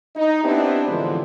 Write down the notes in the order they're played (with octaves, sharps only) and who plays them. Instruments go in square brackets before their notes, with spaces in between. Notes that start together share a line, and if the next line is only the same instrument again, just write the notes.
[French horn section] D#4
B3 C4 D4 E4 G4
A2 D3 E3 F3 G#3